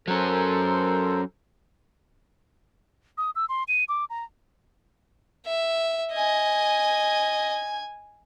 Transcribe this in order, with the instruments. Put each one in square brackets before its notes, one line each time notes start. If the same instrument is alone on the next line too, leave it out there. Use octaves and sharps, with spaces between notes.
[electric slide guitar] F#3 C#4 [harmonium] A4 A#4 C5
[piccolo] D#6
E6
C6
D#7
D6
A#5
[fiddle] E5
[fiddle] D#5 [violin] G#5 G#6